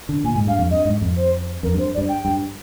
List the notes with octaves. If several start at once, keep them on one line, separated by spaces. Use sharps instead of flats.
D3
A#2 G#5
G#2
G2 F5
F2
G2 D#5
G#2
F2
C5
F2 A#4
G2 C5
D5
G2
G5
G2